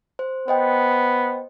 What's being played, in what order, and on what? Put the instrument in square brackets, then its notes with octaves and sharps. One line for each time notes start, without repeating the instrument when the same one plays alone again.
[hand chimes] C5
[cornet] B3 [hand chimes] C5 D#5 G5